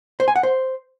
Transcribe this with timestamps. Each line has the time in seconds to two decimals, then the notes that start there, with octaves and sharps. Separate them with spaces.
0.20 C5
0.28 G#5
0.36 F#5
0.43 C5